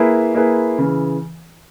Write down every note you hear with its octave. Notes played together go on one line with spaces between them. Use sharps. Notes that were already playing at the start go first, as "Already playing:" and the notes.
Already playing: A#3 E4 G#4 B4
A#3 E4 G#4 B4
C#3 E3